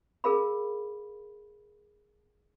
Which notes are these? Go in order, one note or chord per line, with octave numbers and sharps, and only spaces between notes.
G#4 A#4 F5 B5